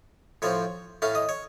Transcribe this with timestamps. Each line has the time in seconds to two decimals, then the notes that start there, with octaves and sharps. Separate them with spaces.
0.42 A2 F3 C4 C#5
1.02 A2 A3 C#4 F5
1.15 D#5
1.29 C#5